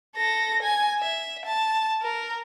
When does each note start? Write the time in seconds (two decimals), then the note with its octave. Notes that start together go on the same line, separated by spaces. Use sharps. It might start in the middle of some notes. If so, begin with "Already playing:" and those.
0.16 A4 A#6
0.62 G#5
1.00 E5
1.46 A5
2.02 A#4